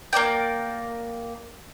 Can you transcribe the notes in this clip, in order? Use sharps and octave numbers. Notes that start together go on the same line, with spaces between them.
A#3 A#4 D5 G5